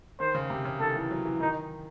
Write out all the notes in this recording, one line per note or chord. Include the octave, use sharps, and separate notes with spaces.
D#3 C5
C#3
C3
C#3
D#3 A4
E3
F#3
E3
D#3 D#4